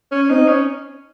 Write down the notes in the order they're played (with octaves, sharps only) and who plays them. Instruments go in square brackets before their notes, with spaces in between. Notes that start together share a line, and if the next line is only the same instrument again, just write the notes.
[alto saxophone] C#4
[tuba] C4 [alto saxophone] D#4
[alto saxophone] C#4